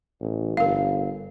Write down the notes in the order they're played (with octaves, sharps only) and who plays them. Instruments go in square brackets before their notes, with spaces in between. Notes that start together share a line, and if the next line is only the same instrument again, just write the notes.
[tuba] A1
[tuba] G1 [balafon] A#4 F5